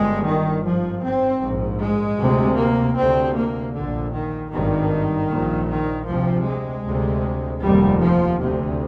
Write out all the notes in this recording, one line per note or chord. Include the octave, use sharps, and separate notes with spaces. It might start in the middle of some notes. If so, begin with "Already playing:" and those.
Already playing: G1 G2 G#3
D#3
G#1 G#2 F3
C4
A#1 G#2
G#3
D2 C3
A#3
D2 C3 C4
A#3
A#1 A#2 D3
D#3
G#1 G2 D#3
A#1 A#2
D#3
D2 C3 F3
G#3
D2 C3
F1 D#2 G3
F3
D2 C3